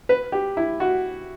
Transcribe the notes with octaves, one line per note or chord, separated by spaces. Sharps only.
B4
G4
E4
F#4